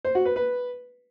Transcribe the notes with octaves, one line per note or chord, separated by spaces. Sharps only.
C5
F#4
B4
B4